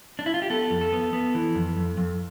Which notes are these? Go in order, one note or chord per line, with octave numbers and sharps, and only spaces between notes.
D4
E4
F4
G4
B3 A4
F2
A4
B3
B3
E3
F2
F2
F2